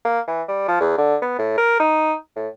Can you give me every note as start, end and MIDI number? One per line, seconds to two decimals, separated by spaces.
0.05 0.20 58
0.28 0.43 52
0.48 0.65 55
0.68 0.79 53
0.81 0.93 40
0.98 1.16 50
1.22 1.34 59
1.39 1.55 45
1.58 1.79 70
1.80 2.15 63
2.36 2.48 45